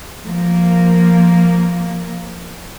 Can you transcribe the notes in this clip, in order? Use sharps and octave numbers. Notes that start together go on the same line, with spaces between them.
F3 A#3